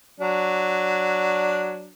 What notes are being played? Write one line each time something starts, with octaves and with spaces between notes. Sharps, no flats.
F#3 D4